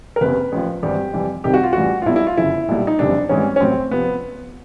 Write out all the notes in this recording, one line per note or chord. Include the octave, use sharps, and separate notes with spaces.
A#4
F#1 E2 C3 B4
A1 A2 F3
G#1 G2 E3 G3 G4
F2 C3 E3 G3
C2 C3 D#3 G3 G4
F#4
F4
A1 A2 E3 G3 F#4
F4
B1 B2 G3 E4
E4
F4
G1 F#2 C#3 E4
B1 A#2 G3
D#4
F#1 F2 C3 E3 G3 D4
G#1 G#2 E3 G3 C#4
C#4
A1 A2 F#3 C4
C3 F3 B3